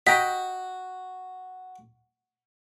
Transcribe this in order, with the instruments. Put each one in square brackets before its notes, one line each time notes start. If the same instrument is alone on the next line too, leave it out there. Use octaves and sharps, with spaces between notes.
[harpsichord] F#4 [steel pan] D#5 G5 A#5 [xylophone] B6